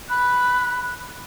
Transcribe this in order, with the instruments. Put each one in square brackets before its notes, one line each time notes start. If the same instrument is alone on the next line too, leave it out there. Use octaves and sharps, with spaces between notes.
[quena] B5 [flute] F#6